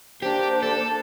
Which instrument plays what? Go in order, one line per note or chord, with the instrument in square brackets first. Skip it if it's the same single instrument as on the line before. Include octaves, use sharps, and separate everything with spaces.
[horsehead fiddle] A#3 D4 [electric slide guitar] G4 [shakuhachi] C5
[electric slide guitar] A4